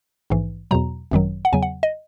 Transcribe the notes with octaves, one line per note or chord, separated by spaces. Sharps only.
A#1 G#2 E3
E2 B2 F#3 A#5
G#1 F#2 D#3 F#3
F#5
E2 C#3 F#3 G#5
F#5
D#5